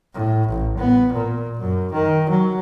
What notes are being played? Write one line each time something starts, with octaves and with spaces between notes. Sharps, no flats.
A2
A1
B3
A#2
F#2
D#3
F#3